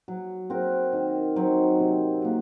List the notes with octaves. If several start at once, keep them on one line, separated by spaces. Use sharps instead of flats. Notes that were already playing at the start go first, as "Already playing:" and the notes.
F#3
C4 F#4 A#4
D#3
F#3 C4 D#4
C3
F#3 A#3